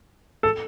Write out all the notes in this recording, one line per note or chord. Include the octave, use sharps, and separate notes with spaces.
A4